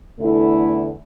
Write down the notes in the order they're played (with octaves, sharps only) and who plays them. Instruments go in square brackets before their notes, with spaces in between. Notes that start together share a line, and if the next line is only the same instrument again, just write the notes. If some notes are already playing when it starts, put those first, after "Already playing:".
[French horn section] E2 D3 A3 E4 A4